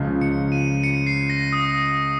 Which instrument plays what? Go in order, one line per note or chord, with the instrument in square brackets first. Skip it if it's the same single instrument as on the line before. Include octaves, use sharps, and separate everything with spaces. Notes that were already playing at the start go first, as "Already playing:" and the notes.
Already playing: [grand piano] C#2 C#3 F3
[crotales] C#7
D#7
C#7
C7
A#6
D#6